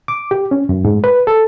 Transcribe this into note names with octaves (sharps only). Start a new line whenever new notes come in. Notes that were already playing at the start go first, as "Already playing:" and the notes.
D6
G4
C#4
F#2
G#2
B4
A4